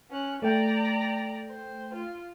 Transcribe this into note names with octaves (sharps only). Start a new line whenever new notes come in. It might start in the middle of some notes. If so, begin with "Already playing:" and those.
C#4 F#6
A3 D5 G5 A#5
C5
F4